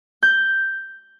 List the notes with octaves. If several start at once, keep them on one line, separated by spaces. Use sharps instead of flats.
G6